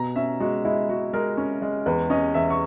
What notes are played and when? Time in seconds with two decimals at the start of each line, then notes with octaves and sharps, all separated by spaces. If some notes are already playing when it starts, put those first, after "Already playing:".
Already playing: B2 A#5
0.16 C#4 E5
0.40 G#3 F#4
0.65 G#3 E4
0.89 G#3 F#4
1.13 G#3 A#4
1.37 C#4
1.62 G#3
1.86 E2 B4
2.10 C#4 D#5
2.34 E2 E5
2.50 C#6